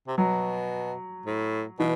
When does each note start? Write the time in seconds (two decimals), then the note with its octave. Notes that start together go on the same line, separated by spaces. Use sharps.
0.08 C3
0.18 B2 F#3
1.26 A2
1.79 B2 E3